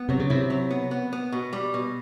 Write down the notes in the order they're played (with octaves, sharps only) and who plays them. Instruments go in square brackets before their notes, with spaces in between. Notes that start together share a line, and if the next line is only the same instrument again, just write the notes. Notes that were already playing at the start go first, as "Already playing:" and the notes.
Already playing: [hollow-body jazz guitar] B3
[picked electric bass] C3 [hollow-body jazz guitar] F#3
[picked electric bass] C#3
[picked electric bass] C3 [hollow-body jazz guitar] E4
[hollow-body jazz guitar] F#3
B3
B3
B3
B2
G3
B2